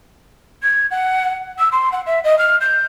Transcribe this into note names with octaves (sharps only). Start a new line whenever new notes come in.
G#6
F#5
E6
C6
F#5
E5
D#5
F6
G6